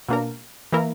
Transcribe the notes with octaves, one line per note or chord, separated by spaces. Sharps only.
B2 A#3 D4 A#4
E3 A#3 E4 A#4